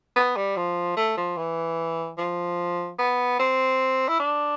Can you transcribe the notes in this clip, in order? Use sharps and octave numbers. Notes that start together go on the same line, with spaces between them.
B3
G3
F3
A3
F3
E3
F3
B3
C4
E4
D4